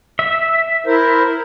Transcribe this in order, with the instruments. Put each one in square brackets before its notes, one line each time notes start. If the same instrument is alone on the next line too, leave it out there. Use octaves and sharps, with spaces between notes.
[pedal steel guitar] E5
[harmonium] E4 A#4 C5